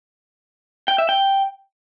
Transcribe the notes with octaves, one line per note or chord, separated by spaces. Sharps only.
G5
E5
G5